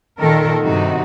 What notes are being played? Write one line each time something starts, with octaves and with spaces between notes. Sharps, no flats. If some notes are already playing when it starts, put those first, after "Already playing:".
A#2 D#3 A4 A#4
G2 C3 D#3 D#4 F#4